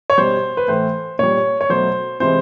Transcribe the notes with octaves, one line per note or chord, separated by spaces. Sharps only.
C#5
B2 G3 C5
B4
A2 E3 A3 C5
A#2 G3 C#5
C#5
B2 F#3 A3 C5
C3 E3 G#3 C5